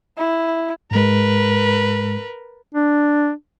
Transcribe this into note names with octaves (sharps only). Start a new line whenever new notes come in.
E4
G#2 G#3 A#4 B4
D4